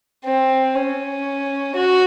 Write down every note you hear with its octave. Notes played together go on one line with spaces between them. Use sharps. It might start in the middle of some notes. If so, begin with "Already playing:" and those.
C4
C#4
F#4